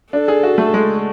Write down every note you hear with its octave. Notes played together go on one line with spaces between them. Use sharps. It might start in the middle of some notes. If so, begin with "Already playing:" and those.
D4 A4
G#4
F#4
A3
G#3